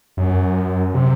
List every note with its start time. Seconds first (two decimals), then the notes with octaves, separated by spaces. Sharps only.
0.17 F#2
0.94 C3